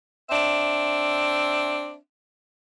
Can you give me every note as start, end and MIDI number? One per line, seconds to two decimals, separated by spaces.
0.30 1.97 60
0.30 1.97 62
0.30 1.97 76